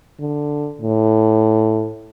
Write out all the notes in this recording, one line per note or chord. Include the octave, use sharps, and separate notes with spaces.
D3
A2